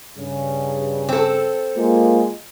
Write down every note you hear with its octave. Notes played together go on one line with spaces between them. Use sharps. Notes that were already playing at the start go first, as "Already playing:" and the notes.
G2 C#3
C4 A4
G#3 A#3 F4